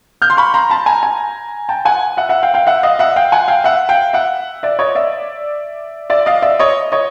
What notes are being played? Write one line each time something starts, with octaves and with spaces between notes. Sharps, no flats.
F6 G6
C6
B5 C#6
A#5 C6
A5 B5
G#5 A#5
G#5 A#5
G5 A5
F#5 G#5
E5 F#5
E5 F#5
F5 G5
F5 G5
E5 F#5
D#5 F5
E5 F#5
F5 G5
F#5 G#5
F5 G5
E5 F#5
F5 G5
E5 F#5
D5 E5
C#5 D#5
D5 E5
D5 E5
D#5 F5
D5 E5
C#5 D#5
C#5 D#5